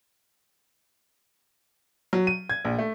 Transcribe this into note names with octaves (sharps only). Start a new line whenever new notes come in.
F#3
D#7
G#6
A#1
A3